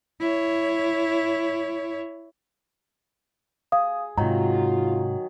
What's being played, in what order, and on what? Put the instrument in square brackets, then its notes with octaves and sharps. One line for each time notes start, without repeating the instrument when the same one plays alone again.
[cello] E4 C#5
[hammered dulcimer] G#4 [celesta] F5 D#6
[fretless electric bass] G#2 C3 [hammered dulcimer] D#3 F#3 [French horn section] F4 [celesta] A#5